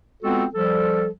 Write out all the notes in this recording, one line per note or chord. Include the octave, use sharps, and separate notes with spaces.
G#3 B3 C4 F4 F#4 A4
F3 G3 A4